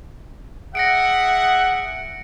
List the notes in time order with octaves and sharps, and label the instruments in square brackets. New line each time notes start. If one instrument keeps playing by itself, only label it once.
[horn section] G#4 E5 F#5 [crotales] A#6 C#7 D7